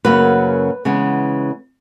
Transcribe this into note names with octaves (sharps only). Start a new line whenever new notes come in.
F#2 C#3 F#3 A#3 B4
C#3 E3 G#3 B3